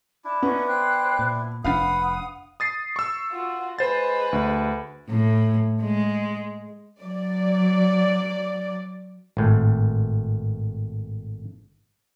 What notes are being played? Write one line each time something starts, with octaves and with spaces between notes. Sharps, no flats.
D4 E4 A5
B3 C#4 D#4
C5 G5 F#6
A#2
F1 A#2 D4 B4 F5 F#5 D#6
D#6 A6 C7
C#6 E6
F4 F#4
G#3 B4 C5 A6
D2
A2
G#3
F#3 D5
G#1 A2